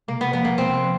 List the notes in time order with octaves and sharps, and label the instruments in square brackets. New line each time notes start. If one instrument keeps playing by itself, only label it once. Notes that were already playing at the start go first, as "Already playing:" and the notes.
[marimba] C3 [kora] A#3
[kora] B3
[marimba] F3 A#3 [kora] B3
[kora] A#3
[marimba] C3 [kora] C4
[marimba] F3